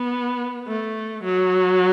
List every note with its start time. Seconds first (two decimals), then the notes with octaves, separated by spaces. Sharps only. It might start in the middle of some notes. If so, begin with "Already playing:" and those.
Already playing: B3
0.68 A3
1.23 F#3